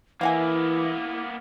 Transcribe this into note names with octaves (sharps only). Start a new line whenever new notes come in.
E3 A#3 B3 E4 F5 F#5 G#5